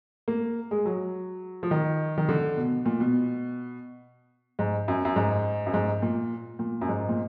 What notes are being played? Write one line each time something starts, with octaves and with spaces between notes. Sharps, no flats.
A#3
G#3
F#3
F3
D#3
D#3
D3
B2
A#2
B2
G#2
F#2
F#2
G#2
F#2
G#2
A#2
A#2
F#2
G#2
A#2